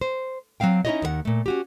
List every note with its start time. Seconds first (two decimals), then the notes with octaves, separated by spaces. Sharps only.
0.01 C5
0.60 F#3 A3 C4 F5 G5
0.85 C#4 D#4 E4 F#4 C#5 D#5
1.02 D#2 D#3 B4 F#5
1.25 A#2 A3
1.46 C#4 F#4 G4